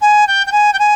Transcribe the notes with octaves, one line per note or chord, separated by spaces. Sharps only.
G#5
G5
G5
G#5
G5
G#5